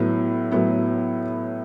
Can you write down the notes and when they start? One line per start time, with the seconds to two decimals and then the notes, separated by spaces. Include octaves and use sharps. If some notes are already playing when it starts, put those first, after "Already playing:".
Already playing: A2 F#3 B3 E4
0.51 A2 F#3 B3 E4